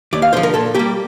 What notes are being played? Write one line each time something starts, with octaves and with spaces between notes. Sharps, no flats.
D#2 D5
F5
D3 F3 C5
A#4
A#2 A4
G3 A#3 G4